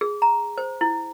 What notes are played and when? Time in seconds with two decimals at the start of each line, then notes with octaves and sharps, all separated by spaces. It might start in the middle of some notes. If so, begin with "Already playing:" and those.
0.01 G#4
0.22 A#5
0.58 C5
0.81 E4